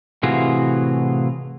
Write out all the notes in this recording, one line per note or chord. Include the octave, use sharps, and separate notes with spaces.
A2 C3 E3 F4 F#4 G#4